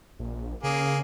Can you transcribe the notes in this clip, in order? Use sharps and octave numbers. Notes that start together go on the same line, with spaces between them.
A#1
C#3 A#3 G#4